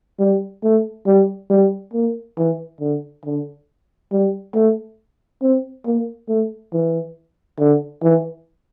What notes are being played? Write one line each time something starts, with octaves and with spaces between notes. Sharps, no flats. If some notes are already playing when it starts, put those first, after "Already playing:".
G3
A3
G3
G3
A#3
E3
D3
D3
G3
A3
C4
A#3
A3
E3
D3
E3